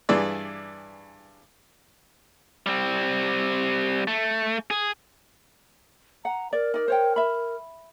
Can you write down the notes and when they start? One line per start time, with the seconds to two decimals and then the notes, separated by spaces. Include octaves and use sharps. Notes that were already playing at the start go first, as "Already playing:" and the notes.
0.09 G2 E3 G#4 D5 E6
2.67 G3 C4
4.07 A3
4.70 G#4
6.25 F#5 A#5
6.53 A#4 D5
6.74 D#4 D5
6.88 C5 C#5 G5
7.16 E5 B5